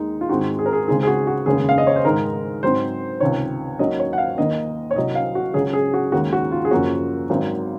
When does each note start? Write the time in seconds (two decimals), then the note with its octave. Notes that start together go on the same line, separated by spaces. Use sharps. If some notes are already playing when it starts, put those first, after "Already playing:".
Already playing: D#2 D#3 G#3 D#4
0.21 F4
0.29 G#2 D#3 G#3 C4 D#4 F#4
0.59 G#4
0.66 A#4
0.73 G#4
0.88 C#2 C#3 G#3 C4 D#4 G#4
1.03 G#4
1.07 F#4
1.27 F#4
1.46 F1 D#2 C#3 G#3 C#4 G#4
1.69 F5
1.78 D#5
1.87 C#5
1.96 C5
2.05 G#2 D#3 G#3 D#4 A#4
2.62 G#2 F#3 C4 D#4 C5
3.20 C#2 C3 D#3 C#5
3.79 D#2 D#3 F#3 C#4 D#5
3.99 C#5
4.13 F#5
4.18 F5
4.38 D#2 D#3 A#3 D#5
4.91 C#5
4.95 C2 C3 F#3 D#5
5.15 F5
5.35 F#4
5.54 C#2 C#3 F#3 C#4 G#4
5.73 G#4
5.94 F#4
6.12 D#2 D#3 G#3 C#4 F#4
6.33 F#4
6.52 F4
6.65 G#4
6.70 F#1 F#2 F3 A#3 C#4 F#4
7.30 G#1 G#2 F#3 C4